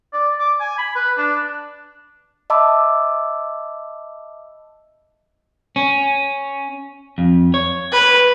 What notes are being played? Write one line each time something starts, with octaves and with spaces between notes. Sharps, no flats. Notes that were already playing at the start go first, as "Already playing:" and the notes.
D5
D6
G#5
B5
B4
D4
D#5 E5 A5 B5 D6 E6
C#4
F2
C#5
B4